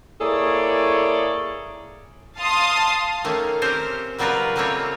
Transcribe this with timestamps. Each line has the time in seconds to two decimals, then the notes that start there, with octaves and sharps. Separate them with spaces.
0.21 A#3 E4 G#4 A4 C#5 D5
2.39 F5 A5 C6 D#6
3.24 D#3 A3 A#3 C#4
3.62 C4 C#4 G4 A#4 C5
4.18 C#3 F#3 G3 F4 A#4 B4
4.56 C#3 G3 A3 A#3 C4 C#5